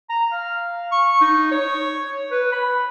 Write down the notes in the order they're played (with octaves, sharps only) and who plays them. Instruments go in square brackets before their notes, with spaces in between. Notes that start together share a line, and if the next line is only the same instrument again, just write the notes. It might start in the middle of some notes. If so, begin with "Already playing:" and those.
[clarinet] A#5
F5
C#6
D#4
C#5
B4
B5